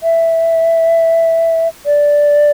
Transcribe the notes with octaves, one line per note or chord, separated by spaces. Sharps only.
E5
D5